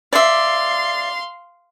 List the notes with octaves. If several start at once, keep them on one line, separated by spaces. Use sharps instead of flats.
D5 E5 F5 C6